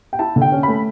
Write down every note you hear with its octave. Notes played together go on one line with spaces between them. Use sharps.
G5
E4 A5
D3
G5
C#4
A3 B5